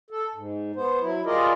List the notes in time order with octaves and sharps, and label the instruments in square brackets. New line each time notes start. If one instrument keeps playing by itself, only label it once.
[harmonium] A4
G#2
B3 C5
F#3 E4
G3 F4 G#4 A#4 D5 D#5